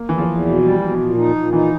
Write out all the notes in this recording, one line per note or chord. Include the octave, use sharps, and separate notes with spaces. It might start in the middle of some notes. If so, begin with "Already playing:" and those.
Already playing: A#3
E2 E3
F3
E2
B2
G3
B2
A#2
D#4
A#2
E3 D#4